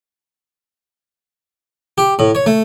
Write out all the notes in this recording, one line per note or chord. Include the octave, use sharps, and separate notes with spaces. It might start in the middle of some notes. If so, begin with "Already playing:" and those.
G4
A2
C#5
A3